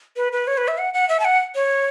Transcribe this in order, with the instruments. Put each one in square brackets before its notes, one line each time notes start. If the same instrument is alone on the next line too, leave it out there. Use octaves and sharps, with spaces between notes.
[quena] B4
B4
C#5
B4
E5
F#5
F#5
E5
A5
F#5
C#5